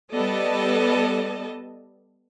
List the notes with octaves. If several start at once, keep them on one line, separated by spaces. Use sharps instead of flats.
G3 B3 A4 D5 D#5 A5